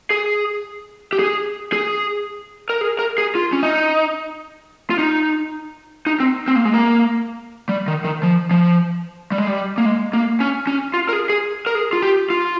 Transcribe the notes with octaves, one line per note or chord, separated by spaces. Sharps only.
G#4
G4
G#4
G#4
A#4
G#4
A#4
G#4
F4
C#4
D#4
F4
D#4
D#4
C4
C4
A#3
G#3
A#3
G3
D#3
D#3
F3
F3
G3
G#3
G3
A#3
G#3
A#3
C#4
C#4
F4
A#4
G#4
G#4
A#4
G#4
F4
G4
F4